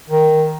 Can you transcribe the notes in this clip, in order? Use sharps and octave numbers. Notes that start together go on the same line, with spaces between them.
D#3